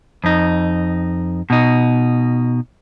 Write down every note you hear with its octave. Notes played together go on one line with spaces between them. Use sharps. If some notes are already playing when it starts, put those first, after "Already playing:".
F2 D#4
B2 D#4